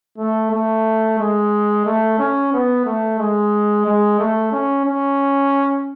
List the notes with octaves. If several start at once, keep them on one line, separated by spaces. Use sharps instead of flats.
A3
A3
G#3
A3
C#4
B3
A3
G#3
G#3
A3
C#4
C#4